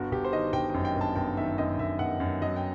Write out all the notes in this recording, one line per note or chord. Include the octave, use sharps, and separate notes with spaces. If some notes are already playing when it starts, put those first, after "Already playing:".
Already playing: G1 F#4
G1 G4
C5
D#3 D#5
G1 G5
F#2 G5
G5
G1
A5
G1 G5
D#3 E5
F#2 D#5
G1 E5
G1 F#5
F#2
F#3 D#5
G5